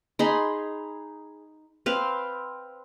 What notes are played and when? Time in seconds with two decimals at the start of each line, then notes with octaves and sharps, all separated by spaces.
0.19 D#4 G#4 B5 C6
1.86 C4 B4 F5